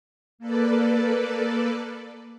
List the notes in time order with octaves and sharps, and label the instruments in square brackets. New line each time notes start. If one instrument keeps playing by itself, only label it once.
[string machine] A#3 A4 B4 D5